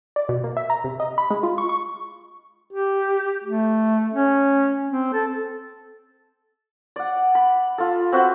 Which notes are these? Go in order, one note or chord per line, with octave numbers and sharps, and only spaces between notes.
D5
B2
A#3
E5
A#5
C3
D#5
B5
G#3
F4
C#6
C#6
G4
A3
C#4
C4
A4
D5 F#5
B5
F4 A4
C4 F#4 B4 F#5